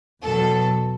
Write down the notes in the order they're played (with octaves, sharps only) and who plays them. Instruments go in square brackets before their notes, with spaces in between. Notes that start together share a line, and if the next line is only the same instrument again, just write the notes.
[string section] E2 B2 F#3 A4